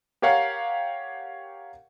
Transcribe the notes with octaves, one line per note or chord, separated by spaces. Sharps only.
G4 A#4 C#5 F5 F#5